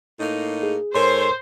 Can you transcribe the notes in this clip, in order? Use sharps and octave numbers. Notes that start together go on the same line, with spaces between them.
A2 A#3 D#4
G#4
G#2 A4 A#4 C5 C#5 C6